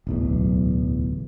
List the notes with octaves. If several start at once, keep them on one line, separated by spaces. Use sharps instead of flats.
D1 B1 E2